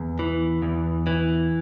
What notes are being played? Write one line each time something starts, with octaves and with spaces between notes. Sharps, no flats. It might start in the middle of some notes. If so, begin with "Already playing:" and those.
Already playing: E2
E3
E2
E3